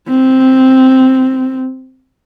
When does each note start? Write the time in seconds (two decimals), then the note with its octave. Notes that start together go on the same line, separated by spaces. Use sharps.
0.08 C4